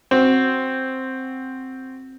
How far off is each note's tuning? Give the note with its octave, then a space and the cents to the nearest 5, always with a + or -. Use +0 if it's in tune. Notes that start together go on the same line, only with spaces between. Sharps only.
C4 +0 F#4 +0